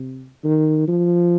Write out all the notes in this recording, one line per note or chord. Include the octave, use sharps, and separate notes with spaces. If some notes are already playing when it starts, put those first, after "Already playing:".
Already playing: C3
D#3
F3